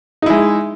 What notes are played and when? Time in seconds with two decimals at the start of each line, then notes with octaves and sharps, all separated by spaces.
0.22 D#4
0.26 E4
0.30 G#3